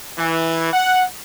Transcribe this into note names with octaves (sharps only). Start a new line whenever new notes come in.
E3
F#5